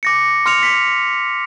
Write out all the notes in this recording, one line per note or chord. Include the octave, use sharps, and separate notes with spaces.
D6 A#6 C#7
C6 F6 C#7 F7
B6